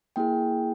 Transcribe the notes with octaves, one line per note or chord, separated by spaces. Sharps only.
A#3 E4 G#4 G5